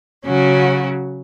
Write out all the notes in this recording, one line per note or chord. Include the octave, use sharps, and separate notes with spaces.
C#3 F#3 C#4 F#4